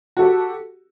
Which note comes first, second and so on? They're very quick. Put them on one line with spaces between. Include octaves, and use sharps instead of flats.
F#4 A4 G4